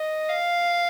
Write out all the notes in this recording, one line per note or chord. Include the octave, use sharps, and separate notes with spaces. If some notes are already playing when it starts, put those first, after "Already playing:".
Already playing: D#5
F5